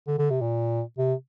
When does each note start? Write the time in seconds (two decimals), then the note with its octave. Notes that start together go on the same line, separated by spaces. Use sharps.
0.07 D3
0.19 D3
0.30 C3
0.42 A#2
0.98 C3